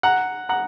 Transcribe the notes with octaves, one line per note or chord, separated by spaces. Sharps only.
F#5 A#5
F#5 A#5